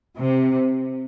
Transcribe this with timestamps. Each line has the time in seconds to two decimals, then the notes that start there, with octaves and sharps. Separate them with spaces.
0.19 C3